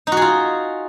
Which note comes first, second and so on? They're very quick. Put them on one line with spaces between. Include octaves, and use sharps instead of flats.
D#4 F#4 G#4 F4